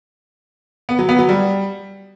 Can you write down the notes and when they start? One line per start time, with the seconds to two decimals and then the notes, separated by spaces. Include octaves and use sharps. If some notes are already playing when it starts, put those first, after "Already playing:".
0.89 B3
0.99 F#3
1.09 B3
1.19 F#3
1.29 G3